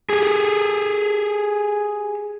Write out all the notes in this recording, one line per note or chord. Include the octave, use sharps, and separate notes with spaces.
G4 G#4